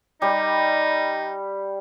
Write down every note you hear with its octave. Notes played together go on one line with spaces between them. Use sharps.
G3 D#4